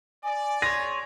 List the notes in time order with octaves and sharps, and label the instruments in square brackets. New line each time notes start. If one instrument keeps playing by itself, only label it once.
[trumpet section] D5 [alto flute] G#5
[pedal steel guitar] G#4 C#5 [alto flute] C6 [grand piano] A#6